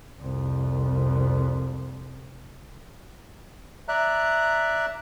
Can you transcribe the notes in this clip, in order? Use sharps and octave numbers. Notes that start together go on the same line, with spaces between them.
C2 F2
D5 E5 A#5 F#6